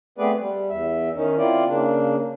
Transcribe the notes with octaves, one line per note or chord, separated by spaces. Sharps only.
A3 B3 C4 G#4 B4 D5
G3
E2 E5
D#3 C#4 D#4
C4 E4 F4 D5
C#3 A#3 D4